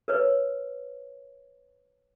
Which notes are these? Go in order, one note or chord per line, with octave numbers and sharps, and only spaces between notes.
A#4 B4 C#5